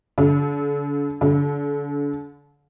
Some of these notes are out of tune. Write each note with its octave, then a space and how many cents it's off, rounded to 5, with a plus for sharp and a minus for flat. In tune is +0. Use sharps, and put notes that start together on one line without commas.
D3 -40
D3 -35